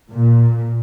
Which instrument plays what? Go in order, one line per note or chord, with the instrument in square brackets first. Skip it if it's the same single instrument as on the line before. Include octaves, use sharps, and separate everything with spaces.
[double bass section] A#2